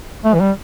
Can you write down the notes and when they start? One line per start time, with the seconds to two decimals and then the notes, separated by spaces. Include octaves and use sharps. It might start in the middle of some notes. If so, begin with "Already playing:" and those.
0.25 A3
0.34 E3
0.40 G3